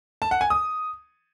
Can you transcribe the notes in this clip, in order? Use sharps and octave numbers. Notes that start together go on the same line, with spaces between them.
A5
F#5
G#5
D#6